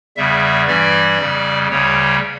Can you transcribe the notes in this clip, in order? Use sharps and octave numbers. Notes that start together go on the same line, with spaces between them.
E2 C#3 G3 E5
G2 E3 G3 D5
F2 C#3 G3
D2 C#3 G3 C#5